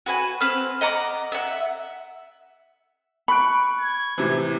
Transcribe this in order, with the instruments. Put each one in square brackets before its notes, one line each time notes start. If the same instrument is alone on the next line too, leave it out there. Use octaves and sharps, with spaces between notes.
[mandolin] F#4 B4 G#5
C4 B4 F6
D#5 F#5 A#5 D6
E5 F#5
[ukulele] B5 [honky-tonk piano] C#6 F#6 D7
[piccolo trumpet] G#6
[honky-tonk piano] A2 C3 E3